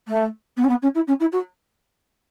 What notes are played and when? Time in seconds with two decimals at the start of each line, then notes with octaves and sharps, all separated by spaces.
0.07 A3
0.56 B3
0.64 C#4
0.69 B3
0.82 C#4
0.94 E4
1.07 C#4
1.20 E4
1.32 F#4